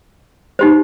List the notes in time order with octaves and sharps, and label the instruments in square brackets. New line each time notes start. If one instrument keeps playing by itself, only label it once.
[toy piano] D#4 G4 C5